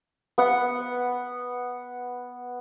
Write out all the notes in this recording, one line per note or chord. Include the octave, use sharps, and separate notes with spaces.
B3 F#5